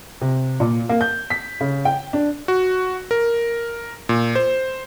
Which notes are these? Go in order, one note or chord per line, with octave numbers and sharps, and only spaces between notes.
C3
A#2
A#3
G6
B6
C#3
G5
D4
F#4
A#4
A#2
C5